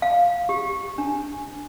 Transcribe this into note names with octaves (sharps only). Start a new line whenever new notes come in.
F5
G4
D4